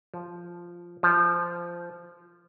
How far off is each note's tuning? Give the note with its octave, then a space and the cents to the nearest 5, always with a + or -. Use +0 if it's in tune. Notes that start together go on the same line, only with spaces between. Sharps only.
F3 -5
F3 -15